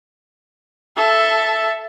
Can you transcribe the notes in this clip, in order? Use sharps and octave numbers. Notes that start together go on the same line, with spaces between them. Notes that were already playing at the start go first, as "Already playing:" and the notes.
A4 E5